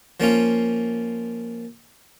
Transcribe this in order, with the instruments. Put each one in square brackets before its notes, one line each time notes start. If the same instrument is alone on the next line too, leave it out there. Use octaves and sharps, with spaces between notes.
[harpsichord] F3 A#3 C#4 F4